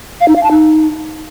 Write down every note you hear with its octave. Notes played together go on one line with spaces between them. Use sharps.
F5
D#4
F5
A5
D#4